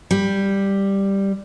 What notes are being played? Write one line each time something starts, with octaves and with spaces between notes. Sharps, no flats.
G3